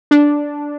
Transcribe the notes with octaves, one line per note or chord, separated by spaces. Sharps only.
D4